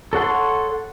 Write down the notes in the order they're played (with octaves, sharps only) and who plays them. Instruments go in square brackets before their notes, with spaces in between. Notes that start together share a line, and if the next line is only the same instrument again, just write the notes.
[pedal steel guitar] A4 C#5 F#5 C6